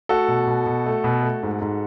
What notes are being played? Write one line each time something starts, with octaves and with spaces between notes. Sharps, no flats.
A3 F#4 A4
B2
B2
B2
A3
B2
A3
G#2
G#2